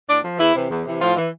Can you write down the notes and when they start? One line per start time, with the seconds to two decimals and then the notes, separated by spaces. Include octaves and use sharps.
0.09 A2 D4 D5
0.24 F3
0.39 E2 E3 E4
0.55 C3 E3
0.71 E2
0.85 C3 E3
1.00 A2 F3 F4
1.17 E3